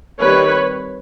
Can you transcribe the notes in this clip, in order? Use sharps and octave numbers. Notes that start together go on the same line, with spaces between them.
D#3 G3 C4 B4 C#5